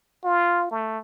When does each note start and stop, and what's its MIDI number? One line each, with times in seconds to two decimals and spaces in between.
0.24 0.70 65
0.71 0.98 57